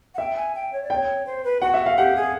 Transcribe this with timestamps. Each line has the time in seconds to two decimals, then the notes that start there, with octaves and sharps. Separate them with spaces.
0.14 F#5
0.18 E5 G5
0.36 G#5
0.55 G5
0.73 C#5
0.83 D5
0.90 C#5 G5
1.26 C5
1.44 B4
1.61 F#4 F#5
1.74 E5
1.86 F5
1.97 G4 F#5
2.16 G#4